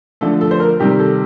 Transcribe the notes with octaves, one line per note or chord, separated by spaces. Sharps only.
D3 F3 A3 A4
A4
C5
A#4
C3 D#3 G3 G4
A4